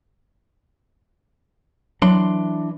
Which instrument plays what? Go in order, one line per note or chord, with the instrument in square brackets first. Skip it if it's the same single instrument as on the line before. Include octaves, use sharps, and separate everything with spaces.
[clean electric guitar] E3 D4 C6 [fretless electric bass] F#3